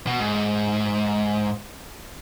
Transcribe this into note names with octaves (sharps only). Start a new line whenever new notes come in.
B2
G#2